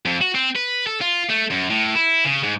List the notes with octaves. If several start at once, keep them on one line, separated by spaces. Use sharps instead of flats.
F2
F#4
C4
B4
A4
F4
A3
F#2
A2
E4
C#3
G#2